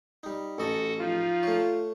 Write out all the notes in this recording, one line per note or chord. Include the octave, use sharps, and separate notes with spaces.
G3 D#4
A1 F#4 A4 D#5 F#5 A5
F3 D#4 F4
A3 C#5